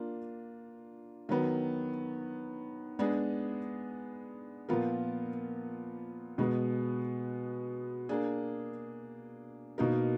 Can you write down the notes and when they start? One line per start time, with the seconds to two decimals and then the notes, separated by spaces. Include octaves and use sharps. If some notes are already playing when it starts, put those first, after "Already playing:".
Already playing: A#3 D4 F4
1.29 D#3 F#3 B3
2.99 G#3 B3 D4 G#4
4.69 A#2 F3 B3 F4 A#4
6.38 B2 G#3 B3
8.09 A#3 D4 G#4
9.78 B2 A#3 D#4 A#4